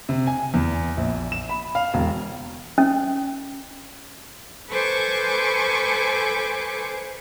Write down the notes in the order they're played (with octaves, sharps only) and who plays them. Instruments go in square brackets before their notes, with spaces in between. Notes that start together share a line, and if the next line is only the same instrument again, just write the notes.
[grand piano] C3
G#5
E2
A#1
E7
B5
F5
E1
[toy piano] C#4
[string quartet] A4 B4 C5 G#5 C#6 D6